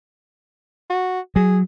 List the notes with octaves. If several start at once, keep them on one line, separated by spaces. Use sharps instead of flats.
F#4
F#3 G#4